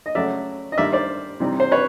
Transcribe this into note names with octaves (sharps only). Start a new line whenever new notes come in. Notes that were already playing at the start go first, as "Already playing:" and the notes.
D#5
C#3 F#3 A3 C#4 D5 E5
D#5
G2 D#3 G3 A#3 D5 E5
C5 D5
C3 E3 G3 C4 D#4
C5
B4 C#5